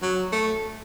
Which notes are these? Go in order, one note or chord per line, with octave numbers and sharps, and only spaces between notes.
F#3
A3